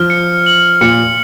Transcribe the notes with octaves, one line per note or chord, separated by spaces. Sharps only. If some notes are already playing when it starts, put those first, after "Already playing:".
Already playing: F3 F6
C#7
F#7
A#2 C#7